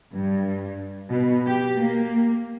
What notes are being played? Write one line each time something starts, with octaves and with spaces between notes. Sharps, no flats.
G2
B2
G4
A#3